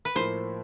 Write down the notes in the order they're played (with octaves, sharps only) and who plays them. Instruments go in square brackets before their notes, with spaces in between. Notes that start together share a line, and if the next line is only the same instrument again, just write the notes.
[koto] B4
[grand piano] A2 F3 A#3 [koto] C5